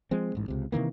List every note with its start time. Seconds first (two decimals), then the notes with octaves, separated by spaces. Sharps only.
0.11 F3 G#3 C4
0.35 A1 G#2
0.48 C#2 C3
0.72 C3 D#3 E3 A#3